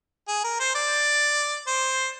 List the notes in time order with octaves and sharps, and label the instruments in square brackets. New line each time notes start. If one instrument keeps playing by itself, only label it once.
[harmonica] G#4
A#4
C5
D5
C5